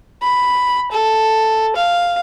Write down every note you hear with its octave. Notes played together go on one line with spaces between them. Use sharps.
B5
A4
F5